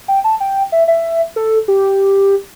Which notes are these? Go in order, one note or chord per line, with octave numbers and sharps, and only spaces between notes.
G5
A5
G5
E5
E5
A4
G4